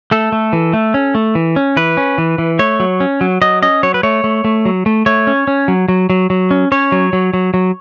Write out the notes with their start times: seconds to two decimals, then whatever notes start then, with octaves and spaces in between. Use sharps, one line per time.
0.11 A3 A4
0.32 A3
0.53 E3
0.73 A3
0.94 C#4
1.15 A3
1.35 E3
1.56 C#4
1.77 E3 B4
1.97 C#4
2.18 E3
2.38 E3
2.59 A3 C#5
2.80 F#3
3.00 C#4
3.21 F#3
3.42 F#3 D#5
3.62 C#4 D#5
3.83 F#3 C#5
3.94 B4
4.03 A3 C#5
4.24 A3
4.44 A3
4.65 F#3
4.86 A3
5.06 A3 C#5
5.27 C#4
5.48 C#4
5.68 F#3
5.88 F#3
6.10 F#3
6.30 F#3
6.51 C#4
6.72 C#4 C#5
6.92 F#3
7.13 F#3
7.34 F#3
7.54 F#3